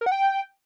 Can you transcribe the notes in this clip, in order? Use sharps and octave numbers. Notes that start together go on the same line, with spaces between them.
A#4
F#5
G5